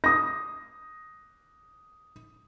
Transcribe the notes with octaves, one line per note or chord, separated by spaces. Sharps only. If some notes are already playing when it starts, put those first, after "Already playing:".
D#6 A#6